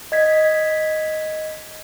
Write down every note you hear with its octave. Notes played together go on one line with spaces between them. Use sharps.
D#5 G#6 B6